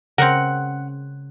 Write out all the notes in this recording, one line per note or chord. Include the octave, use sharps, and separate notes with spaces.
C#3 C4 A#4 C#5 F#5